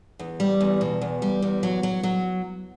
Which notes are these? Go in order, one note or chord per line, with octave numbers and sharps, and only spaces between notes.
E2
G3
E2
B2
E2
G3
E2
F#3
F#3
F#3